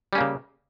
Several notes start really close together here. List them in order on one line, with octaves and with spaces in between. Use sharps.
G3 C#4 A#3 C#3